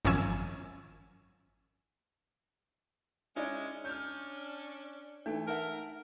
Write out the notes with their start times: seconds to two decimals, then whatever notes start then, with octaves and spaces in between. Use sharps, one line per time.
0.05 G#1 F#2 F3 C#4 G#5 E6
3.36 G#3 C#4 D#4 E4 D5
3.85 C#4 D4 F6 G6
5.26 E3 A3 D4 D#4 A4
5.47 A#4 E5 F#5 A5